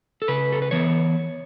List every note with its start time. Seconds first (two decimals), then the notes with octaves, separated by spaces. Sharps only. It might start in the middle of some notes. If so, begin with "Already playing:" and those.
0.22 A4
0.28 C#3 B4
0.52 A4
0.62 B4
0.71 E3 B3 C#5